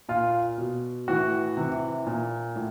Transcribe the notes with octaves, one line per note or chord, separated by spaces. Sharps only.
A#2 F4
B2
A2 E3 F#4
C3 E3
A#2
A2